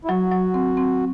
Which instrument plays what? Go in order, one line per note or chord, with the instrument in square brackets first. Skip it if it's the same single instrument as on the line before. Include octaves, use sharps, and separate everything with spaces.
[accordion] E4
[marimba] F#3 [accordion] F#4
[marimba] F#3
C4
C4